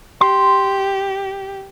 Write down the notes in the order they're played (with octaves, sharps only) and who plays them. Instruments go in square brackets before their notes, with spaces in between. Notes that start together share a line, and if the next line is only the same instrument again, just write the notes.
[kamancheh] G4 [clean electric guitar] C6